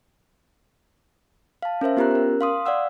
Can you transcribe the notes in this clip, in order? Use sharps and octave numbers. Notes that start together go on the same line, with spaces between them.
F5 A5
C#4 A#4 C5 E5
B3 F4 G4 A#4 A#5 F#6
C#4 A#4
F5 C6 D#6
D5 F5 F#5 E6